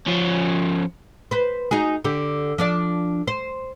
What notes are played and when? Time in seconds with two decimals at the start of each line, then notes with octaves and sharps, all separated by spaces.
0.07 F3 C#4
1.31 B4 C5
1.71 D#4 F#4 G#4
2.04 D3 G4
2.58 F3 D4 D5
3.27 C5